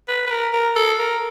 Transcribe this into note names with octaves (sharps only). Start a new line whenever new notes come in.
B4
B4
A#4
A#4
A4
A#4